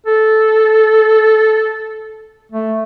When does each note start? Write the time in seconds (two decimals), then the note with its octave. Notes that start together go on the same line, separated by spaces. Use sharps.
0.06 A4
2.52 A3